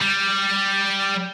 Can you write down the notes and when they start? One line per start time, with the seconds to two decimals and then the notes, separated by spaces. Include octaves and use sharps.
0.02 G3